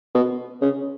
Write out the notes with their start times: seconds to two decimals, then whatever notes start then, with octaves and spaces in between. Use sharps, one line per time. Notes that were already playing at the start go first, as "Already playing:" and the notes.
0.15 B2
0.62 C#3